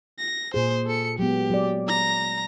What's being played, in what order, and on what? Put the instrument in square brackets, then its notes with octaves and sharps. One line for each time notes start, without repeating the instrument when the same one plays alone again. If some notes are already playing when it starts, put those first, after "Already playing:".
[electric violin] A#6
[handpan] A#2 G#4 [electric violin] C5
[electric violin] A4 C#7
[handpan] F#3 G#3 B3 [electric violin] G4
[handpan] F#3 G#4 D5
[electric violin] A#5 A#6